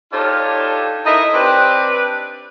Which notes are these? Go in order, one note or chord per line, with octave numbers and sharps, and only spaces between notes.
D4 D#4 F4 G4 A4 C#5
D#4 E4 A4 A#4 D#5
C4 D4 G4 B4